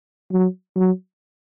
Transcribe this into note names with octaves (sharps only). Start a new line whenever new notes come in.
F#3
F#3